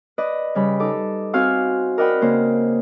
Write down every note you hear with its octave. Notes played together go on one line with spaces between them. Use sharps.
B4 D5 D#5
C#3 G3 B5
D#4 A4 D6
C4 F#4 F5 G#5 C6 E6
A#4 D5 D#5 F#5 G5 B5
C#3 A#3 C5